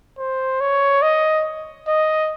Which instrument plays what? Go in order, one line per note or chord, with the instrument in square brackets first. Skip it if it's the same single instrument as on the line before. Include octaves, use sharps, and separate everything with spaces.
[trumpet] C5
C#5
D#5
D#5